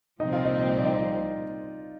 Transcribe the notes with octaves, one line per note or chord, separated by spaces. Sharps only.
C2 A#2 F3 C4 D#4 D#5
F4 F5
D#4 D#5
D#5
D5
D#4 D#5